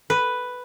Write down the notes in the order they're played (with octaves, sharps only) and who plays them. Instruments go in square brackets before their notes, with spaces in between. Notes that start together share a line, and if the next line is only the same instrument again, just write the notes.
[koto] B4